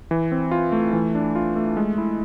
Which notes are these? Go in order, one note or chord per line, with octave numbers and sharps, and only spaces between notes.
E3
C4
F4
A3
E3
D4
F4
A3
G#3
E4